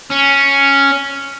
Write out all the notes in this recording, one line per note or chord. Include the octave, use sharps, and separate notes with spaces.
C#4